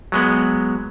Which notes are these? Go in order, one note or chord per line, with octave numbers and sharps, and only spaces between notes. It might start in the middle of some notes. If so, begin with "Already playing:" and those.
F#3 G#3 B3